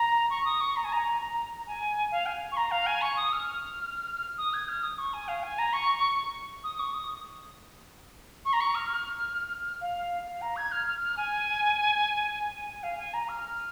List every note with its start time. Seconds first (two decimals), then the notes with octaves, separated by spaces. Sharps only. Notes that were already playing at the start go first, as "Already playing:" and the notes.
Already playing: A#5
0.30 C#6
0.45 D#6
0.60 C#6
0.76 A#5
0.84 G#5
0.92 A#5
1.21 A#5
1.67 G#5
2.11 F5
2.26 G#5
2.52 C#6
2.57 A#5
2.71 F5
2.86 G#5
3.01 C#6
3.16 D#6
3.32 F6
4.37 D#6
4.53 G#6
4.68 F6
4.83 D#6
4.98 C#6
5.13 G#5
5.28 F5
5.43 G#5
5.58 A#5
5.73 C#6
6.64 D#6
6.79 C#6
6.94 D#6
8.45 C#6
8.53 A#5
8.60 C#6
8.75 F6
8.90 F6
9.81 F5
10.27 F5
10.41 A#5
10.56 G#6
10.71 F6
10.86 F6
11.01 F6
11.17 G#5
12.53 G#5
12.67 G#5
12.83 F5
12.97 G#5
13.13 A#5
13.28 F6